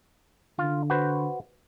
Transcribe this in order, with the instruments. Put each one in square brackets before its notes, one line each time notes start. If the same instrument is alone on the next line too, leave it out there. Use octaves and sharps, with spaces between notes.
[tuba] D3 [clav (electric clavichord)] F4
[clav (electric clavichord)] F#4 B4 C5